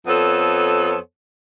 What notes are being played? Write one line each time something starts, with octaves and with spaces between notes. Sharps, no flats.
F2 B3 A4 C5 C#5